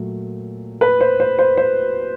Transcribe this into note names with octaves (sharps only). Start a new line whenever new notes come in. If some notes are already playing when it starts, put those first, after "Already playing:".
Already playing: A#2 F#3 A3
B4
C5
C5
C5
C5